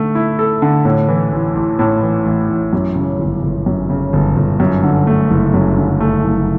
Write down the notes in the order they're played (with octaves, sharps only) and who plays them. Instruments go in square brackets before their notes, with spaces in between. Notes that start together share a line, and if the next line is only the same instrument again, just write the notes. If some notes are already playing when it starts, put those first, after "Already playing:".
Already playing: [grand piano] D3 A3
E4
A4
D3
A2
E3
A1
A1
A2
E3
A1
A1
F#2
C#3
G1
G1
F#2
C#3
G1
G1
F#2
D3
A3
F#1
F#2
D3
A3
F#1